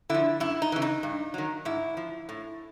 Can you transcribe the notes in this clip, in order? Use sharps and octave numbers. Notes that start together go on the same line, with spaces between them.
D3 F3 E4
F#2 E4
D#4
C#3 E3
D#4
G2
D#3 F#3
G#2 E4
F3
A2